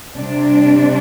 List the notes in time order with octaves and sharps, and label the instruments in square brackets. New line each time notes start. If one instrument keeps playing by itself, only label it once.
[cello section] C3 G3 D4